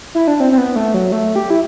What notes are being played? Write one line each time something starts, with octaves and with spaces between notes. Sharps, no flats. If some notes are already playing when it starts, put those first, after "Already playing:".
E4
D4
C4
C4
B3
A3
F#3
A3
G4
E4